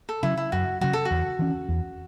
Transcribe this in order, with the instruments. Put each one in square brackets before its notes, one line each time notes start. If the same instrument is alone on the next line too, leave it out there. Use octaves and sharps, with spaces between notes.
[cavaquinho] A4
[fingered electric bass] C#3 F#3 [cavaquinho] E4
[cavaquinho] E4
[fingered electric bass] F#2 [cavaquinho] F#4
[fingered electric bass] C#3 F#3 [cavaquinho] F#4
[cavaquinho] A4
F#4
[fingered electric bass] E2
E3 C#4
E2